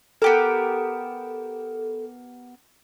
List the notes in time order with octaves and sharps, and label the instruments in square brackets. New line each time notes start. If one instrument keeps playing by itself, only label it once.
[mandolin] B3 G4 A#4 [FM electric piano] A4